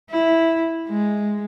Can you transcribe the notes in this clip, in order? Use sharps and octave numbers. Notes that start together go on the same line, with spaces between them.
E4
G#3